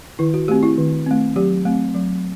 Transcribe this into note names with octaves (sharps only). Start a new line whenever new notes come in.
D#3 E4
F#4
A3 C4 G4
E4
D#3
A3 C4
F#3 G4
A3 C4
F#3